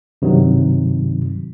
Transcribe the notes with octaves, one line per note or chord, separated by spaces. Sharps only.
G2 C3 D#3 F#3